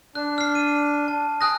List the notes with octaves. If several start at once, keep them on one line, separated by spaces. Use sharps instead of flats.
D4 F#6
F6 C7
D#7
A5
G#5 D#6 F#6 A#6